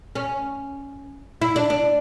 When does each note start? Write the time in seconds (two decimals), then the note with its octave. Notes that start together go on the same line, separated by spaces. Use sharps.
0.15 C#4
1.42 E4
1.56 D4
1.70 D4